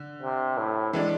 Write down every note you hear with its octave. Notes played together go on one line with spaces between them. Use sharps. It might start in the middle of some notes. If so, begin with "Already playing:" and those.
Already playing: D3
C3
A2
E3 G#3 D4